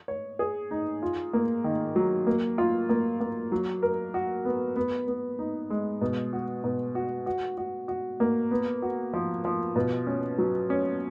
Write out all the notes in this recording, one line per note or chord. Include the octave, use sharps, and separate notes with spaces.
C#5
G#4
D#4
F4
A#3
D#3
F#3
A#3
F4
A#3
A#3
F#3
A#4
F#4
B3
B3
B3
D#4
G#3
B2
F#4
B2
F#4
F#4
F#4
F#4
A#3
B3
F#4
F3
F3
B2
C#4
F#3
C#4